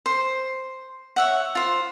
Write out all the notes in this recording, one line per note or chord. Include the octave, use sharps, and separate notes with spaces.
C5
C#5 E5 F#5
F4 C5